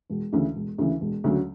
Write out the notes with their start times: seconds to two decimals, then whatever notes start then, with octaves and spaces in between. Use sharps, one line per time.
0.10 E1
0.33 D2 C#3 E3
0.56 E1
0.78 D2 C#3 E3
1.01 E1
1.24 D2 C#3 F#3 C#4